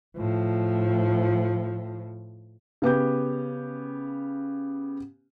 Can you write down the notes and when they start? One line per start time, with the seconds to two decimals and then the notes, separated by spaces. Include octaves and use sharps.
0.17 A2 F3
2.82 C#3 B3 G4 G6